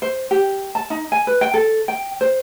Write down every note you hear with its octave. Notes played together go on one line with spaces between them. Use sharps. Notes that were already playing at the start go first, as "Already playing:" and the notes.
C5
G4
A5
D#4
G#5
B4
G5
A4
G5
C5